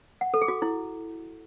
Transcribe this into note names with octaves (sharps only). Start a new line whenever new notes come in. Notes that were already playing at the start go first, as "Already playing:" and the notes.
F#5
A4
G#4
F#4
E4